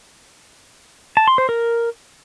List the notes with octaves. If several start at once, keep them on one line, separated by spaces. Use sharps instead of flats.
A5
C6
C5
A#4